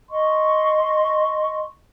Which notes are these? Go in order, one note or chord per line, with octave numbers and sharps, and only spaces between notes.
D#5 C6 C#6